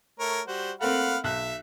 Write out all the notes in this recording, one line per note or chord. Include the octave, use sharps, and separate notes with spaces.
A3 A#4 C#5
G3 F#4 C5
A3 A#3 C4 F5 F#5 B5
B1 E5 F#6